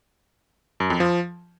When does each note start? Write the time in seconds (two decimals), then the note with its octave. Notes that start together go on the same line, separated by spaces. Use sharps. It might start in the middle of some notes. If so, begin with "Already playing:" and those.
0.80 F#2
0.90 F2
1.00 F3